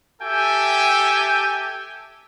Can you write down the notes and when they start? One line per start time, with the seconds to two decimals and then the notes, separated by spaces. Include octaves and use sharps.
0.22 G4 A4 E5 G5 G#5